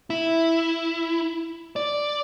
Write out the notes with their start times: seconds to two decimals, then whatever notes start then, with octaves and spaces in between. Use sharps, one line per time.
0.10 E4
1.76 D5